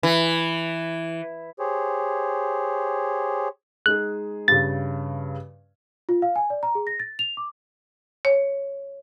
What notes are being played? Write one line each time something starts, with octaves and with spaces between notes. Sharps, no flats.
E3
G4 G#4 C5 C#5
G#3 D#4 G#4 F#6
G2 C#3 A6
F4
F5
G#5
D5
A#5
G#4
A#6
A6
F7
D6
C#5